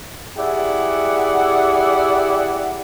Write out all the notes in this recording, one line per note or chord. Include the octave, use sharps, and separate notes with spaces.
E4 G4 G#4 D5 F#5